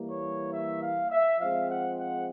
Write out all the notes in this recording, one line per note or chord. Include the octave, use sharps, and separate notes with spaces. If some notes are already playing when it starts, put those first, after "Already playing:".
Already playing: E3 G3 A#3
C#5
E5
F5
E5
F3 G#3 C4 F5
F#5
F#5